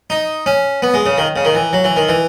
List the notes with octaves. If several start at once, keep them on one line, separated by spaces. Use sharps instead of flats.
D#4
C#4
B3
G#3
C#3
D#3
C#3
D#3
E3
F#3
E3
D#3
E3